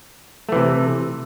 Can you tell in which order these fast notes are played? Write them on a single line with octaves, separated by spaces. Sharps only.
A3 E3 C3